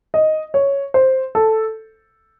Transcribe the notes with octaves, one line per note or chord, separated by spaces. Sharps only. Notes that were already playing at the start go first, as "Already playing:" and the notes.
D#5
C#5
C5
A4